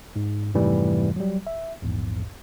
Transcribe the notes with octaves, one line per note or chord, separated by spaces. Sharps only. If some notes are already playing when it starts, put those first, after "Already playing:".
G#2
F2 G#2 C3 E3 G3 A3
F#3 G3
E5
A#1 E2 G#2